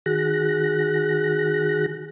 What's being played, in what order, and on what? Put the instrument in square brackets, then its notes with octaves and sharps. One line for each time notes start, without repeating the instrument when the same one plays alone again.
[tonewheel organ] D#3 F#4 G#4 F#6 A#6